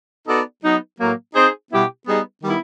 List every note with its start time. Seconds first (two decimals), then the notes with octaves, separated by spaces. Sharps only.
0.28 B3 D#4 F#4 A4 D5
0.63 F#3 B3 D#4
0.99 A2 F#3 A#3
1.35 C4 D#4 G#4 C5
1.71 B2 G3 B3 E4 G4
2.07 G3 B3 D#4 G#4
2.42 D#3 G3 B3 E4